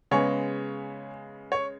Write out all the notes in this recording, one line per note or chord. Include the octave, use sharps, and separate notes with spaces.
C#3 G#3 B3 C#5
C#5